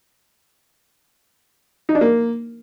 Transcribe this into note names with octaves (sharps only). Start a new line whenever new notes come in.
D#4
D4
A#3